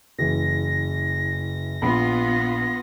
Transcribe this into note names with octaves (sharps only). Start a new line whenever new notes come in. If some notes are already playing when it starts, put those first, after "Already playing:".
F#1 E3 A#6
A#1 B3 F4 B5